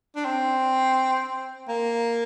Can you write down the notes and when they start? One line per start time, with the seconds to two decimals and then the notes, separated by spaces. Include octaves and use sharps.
0.16 D4
0.25 C4
1.69 A#3